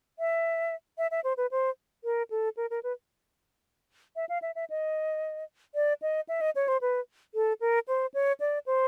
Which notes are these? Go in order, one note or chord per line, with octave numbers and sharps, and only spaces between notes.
E5
E5
E5
C5
B4
C5
A#4
A4
A#4
A#4
B4
E5
F5
E5
E5
D#5
D5
D#5
E5
D#5
C#5
C5
B4
A4
A#4
C5
C#5
D5
C5